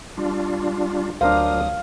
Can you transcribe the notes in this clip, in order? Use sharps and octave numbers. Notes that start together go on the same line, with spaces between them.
G3 D4 F4
D2 F#3 D4 A#4 C5 F5 D#6